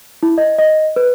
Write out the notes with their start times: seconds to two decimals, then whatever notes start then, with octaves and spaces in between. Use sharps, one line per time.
0.23 E4
0.38 D#5
0.59 D#5
0.96 B4